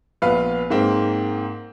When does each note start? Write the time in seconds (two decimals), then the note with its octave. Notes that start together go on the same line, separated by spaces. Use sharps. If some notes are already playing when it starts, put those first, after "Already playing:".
0.22 A#1 B3 B4 F5
0.70 G#2 A#3 C4